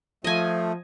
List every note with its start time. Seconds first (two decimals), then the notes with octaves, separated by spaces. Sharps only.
0.24 F3 A3 D#5 G#5